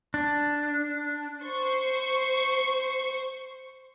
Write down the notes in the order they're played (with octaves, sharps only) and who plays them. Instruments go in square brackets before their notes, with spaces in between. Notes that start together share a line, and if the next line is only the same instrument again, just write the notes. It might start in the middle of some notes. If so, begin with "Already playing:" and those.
[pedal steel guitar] D4
[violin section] C5 C#6